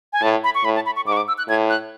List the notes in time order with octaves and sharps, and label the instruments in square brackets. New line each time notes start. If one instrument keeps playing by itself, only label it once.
[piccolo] G#5
[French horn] A2 [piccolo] A5
[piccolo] B5
C#6
[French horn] A2 [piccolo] B5
[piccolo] A5
B5
C#6
[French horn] G#2 [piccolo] D6
[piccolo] C#6
D6
E6
F#6
[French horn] A2 [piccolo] G#6
[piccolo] F#6